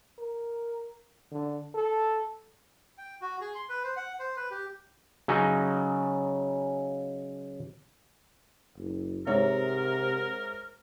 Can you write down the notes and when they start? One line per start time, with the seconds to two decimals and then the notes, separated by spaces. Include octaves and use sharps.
0.19 A#4
1.32 D3
1.75 A4
2.98 G5
3.22 F#4
3.41 G#4
3.55 C6
3.69 B4
3.84 C5
3.97 F#5
4.20 C5
4.37 B4
4.51 G4
5.28 C#3 F#3 C#4 D#4
8.77 F#1
9.27 G#2 C3 A#4 C#5 E5